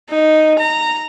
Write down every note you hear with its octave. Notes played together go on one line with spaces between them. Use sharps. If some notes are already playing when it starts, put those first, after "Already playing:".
D#4
A#5